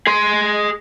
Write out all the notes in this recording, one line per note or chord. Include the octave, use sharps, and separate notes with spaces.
G#4 C6